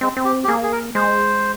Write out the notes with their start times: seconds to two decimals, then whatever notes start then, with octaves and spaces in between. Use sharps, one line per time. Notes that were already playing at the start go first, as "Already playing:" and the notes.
0.01 G#3 C4
0.17 C4
0.25 G4
0.44 G4
0.48 A#3 G#4
0.63 G#4
0.72 A#4
0.95 G#3 C5